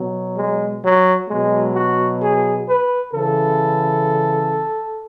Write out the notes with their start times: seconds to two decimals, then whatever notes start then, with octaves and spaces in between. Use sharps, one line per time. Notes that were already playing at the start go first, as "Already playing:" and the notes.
Already playing: B2 F#3
0.36 G#3
0.83 F#3
1.29 B2 F#3 G#3
1.75 F#4
2.22 G#4
2.68 B4
3.14 C#3 E3 A4